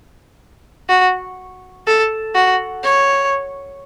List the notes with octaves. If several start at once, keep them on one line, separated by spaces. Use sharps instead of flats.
F#4
A4
F#4
C#5